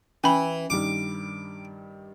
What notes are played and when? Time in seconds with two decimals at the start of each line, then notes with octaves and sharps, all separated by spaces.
0.24 E3 C#4 G#5 B5
0.70 G2 D#3 G3 D6